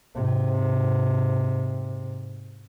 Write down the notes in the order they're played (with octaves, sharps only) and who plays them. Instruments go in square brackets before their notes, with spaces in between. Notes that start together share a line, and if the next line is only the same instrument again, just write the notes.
[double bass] G#2 C3